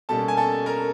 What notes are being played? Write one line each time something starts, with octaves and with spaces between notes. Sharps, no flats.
B2 G3 A#3 C#4 A4 A5
G#5
A4 A5
A#4 A#5